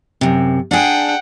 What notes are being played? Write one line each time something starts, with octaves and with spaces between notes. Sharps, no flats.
F#2 C3
D4 G#4 F#5 G5